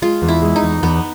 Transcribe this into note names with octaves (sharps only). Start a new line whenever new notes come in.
G#3 F4
E2
E4
G#3
D#4
E2
E2 B3